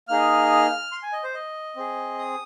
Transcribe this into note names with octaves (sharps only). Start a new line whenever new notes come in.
A#3 D#4 G#4 F6
C6
G#5
D#5
C5
D#5
C4 G#4
D#6